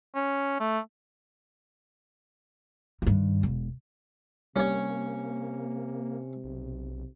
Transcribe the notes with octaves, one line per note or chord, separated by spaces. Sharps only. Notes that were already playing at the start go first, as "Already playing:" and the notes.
C#4
A3
G2 D#3
E1
C3 G3 A#3 C#4 C#5
B1